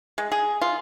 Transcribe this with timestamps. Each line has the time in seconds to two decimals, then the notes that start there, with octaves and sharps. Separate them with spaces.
0.18 G#3
0.32 G#4
0.62 F4